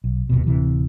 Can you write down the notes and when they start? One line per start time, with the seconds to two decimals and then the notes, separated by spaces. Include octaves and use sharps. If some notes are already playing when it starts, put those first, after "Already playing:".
0.04 B1
0.29 D#1 C2 G2 B2
0.46 D1 C3 E3